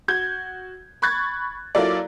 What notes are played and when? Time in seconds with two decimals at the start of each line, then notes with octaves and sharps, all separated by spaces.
0.08 F#4 G6 G#6
1.02 B5 C#6 F#6 G#6 A6
1.75 F#3 A#3 E4 F4 A4 D5